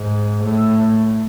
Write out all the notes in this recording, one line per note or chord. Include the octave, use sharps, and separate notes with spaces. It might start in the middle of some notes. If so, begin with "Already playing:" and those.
Already playing: G#2
A2